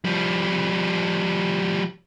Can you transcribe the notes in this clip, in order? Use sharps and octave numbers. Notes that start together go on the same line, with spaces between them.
F3 G3